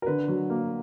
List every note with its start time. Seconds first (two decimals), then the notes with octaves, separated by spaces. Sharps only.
0.02 A#4
0.06 D3 B4
0.28 F#3
0.50 A#3